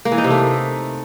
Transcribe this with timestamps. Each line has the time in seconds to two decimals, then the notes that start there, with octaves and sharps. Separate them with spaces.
0.05 A#3
0.12 E3
0.18 D#4
0.24 C3
0.30 A3